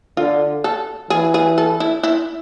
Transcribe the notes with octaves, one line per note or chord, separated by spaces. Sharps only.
D3 F4
A4
E3 G#4
G#4
A4
E4
E4